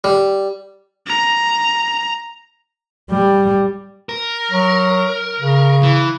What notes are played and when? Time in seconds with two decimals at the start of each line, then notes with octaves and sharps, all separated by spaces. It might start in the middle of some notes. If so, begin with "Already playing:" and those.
0.04 G3
1.07 A#5
3.11 G3
4.09 A#4
4.52 F#3
5.40 C#3
5.83 E3